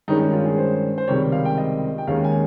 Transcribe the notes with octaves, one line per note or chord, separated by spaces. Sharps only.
G2 D#3 G#3 C#4 D#4
D#4
F4
G#4
C5
C5
C#2 C3 D#3 G3 C4 C#5
F5
G5
D#5
G5
D#2 D#3 G#3 C#4 F5
G#5